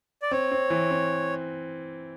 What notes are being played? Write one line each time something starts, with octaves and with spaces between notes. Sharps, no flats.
D5
C4 C#5
C4
E3
C4